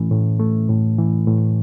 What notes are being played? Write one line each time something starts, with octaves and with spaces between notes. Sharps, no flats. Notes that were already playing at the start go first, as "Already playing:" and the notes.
Already playing: A2 E3 A3 C#4
A2
A3
A2
E3
A2